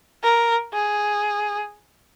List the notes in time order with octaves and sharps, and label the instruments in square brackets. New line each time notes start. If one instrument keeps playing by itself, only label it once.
[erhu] A#4
G#4